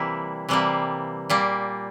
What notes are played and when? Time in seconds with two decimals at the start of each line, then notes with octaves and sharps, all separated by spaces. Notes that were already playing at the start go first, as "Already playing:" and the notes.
Already playing: C3 E3 G3 A#3 E4
0.49 C3 E3 G3 A#3
1.29 A#2 G3 A#3